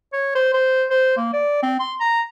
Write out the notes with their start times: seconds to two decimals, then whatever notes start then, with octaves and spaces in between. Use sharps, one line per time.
0.13 C#5
0.35 C5
0.54 C5
0.90 C5
1.17 A#3
1.33 D5
1.63 C4
1.80 C6
2.00 A#5